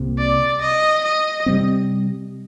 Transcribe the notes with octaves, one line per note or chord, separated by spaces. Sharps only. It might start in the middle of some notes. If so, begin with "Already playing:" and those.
Already playing: C2 C3 A#3
D5
D#5
D#5
C3 G3 C4